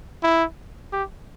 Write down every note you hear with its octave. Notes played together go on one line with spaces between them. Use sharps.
E4
G4